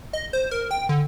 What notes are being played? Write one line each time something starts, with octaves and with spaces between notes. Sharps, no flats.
D#5
C5
A#4
G5
D3